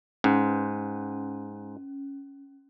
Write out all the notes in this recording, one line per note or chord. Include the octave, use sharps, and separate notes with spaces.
G#2 C#4